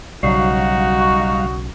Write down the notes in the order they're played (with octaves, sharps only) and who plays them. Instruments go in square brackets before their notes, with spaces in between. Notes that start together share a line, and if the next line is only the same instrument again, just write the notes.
[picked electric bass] B1 C#3 F#3 [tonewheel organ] G3 F5 [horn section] D#4 F#4